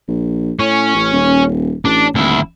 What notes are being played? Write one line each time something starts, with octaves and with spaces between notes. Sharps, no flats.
A#1
A2 C#4
A1
D#1
A1 D4
D#1 D2 E4